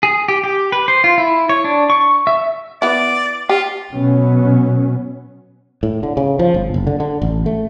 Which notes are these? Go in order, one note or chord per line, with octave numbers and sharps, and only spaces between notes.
G#4
G4
G4
B4
C5
F4
E4
C#5
D4
C#6
E5
B3 E4 D5
F4 G4
B2 F#3 B3 C#4
A2
D3
C#3
F3
G1
F#1
D3
D3
A1
A3